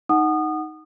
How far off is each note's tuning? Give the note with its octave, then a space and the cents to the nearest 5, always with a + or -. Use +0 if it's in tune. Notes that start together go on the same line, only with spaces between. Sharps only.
D#4 +0 F#5 +0 D#6 -25